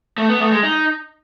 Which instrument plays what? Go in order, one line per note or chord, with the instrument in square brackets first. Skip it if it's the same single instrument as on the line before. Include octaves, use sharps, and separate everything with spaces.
[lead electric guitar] A3
B3
A3
G#3
D#4